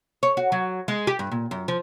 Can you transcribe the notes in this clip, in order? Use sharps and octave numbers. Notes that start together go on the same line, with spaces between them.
C#5
F#4
F#3
G#3
G4
G2
A#2
F#2
F3